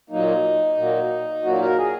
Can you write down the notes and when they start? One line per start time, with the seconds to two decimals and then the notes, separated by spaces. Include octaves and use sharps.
0.10 A#2 F#3 A#3 D#4
0.77 A#2 F#3 A#3
1.43 A#2 F#3 A#3 F#4
1.60 A#4
1.77 G#4